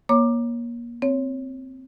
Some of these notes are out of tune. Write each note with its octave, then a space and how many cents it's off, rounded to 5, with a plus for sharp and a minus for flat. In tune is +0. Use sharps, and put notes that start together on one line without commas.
A#3 +30 C#5 +0 D6 +15
C4 +0 C#5 +0